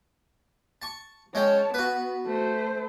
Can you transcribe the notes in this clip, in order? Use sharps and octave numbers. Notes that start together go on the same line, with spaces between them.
A5 C#6
G#3 C#4 C#5 G5 A5
B3 F#4 B4
A3 C5